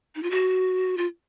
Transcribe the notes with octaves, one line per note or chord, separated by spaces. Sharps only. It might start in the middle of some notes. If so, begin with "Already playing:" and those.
D#4
F4
F#4
F4